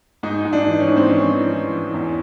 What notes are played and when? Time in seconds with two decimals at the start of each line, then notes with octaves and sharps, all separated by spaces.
0.23 G#2 D#4
0.45 G#2
0.53 D4
0.67 E3
0.80 C#4
0.88 G#2
0.97 C4
1.09 E3 C#4
1.30 E3
1.52 E3
1.72 E3
1.94 E2